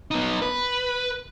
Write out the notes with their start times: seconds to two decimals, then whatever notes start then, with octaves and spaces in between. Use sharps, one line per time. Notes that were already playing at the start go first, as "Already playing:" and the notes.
0.11 B3 D#4
0.42 B4